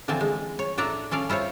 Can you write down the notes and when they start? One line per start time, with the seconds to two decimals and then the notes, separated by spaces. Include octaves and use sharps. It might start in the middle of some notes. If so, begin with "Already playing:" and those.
0.08 D3 E3 F3 C4 G#5 A5
0.21 G#3
0.59 C#5
0.78 A2 D4 A4 D5 E5 A#5
1.11 C#4 A4 D5 F5
1.29 E4 F4 C5 C#5